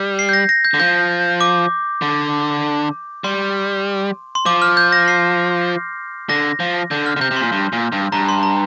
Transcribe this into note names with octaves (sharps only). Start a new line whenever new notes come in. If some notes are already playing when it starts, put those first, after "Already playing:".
Already playing: G3
C7
G6
A#6
A#6
G6
D3
F3 G6
D6
D3
G3 C6
C6
F3 D6
F6
G6
A#6
C7
D3 A#6
F3
D3 G6
F6
D3
C3 G6
C3
C6
A#2
G2
A#2
G2
G2 A#5
C6
A#5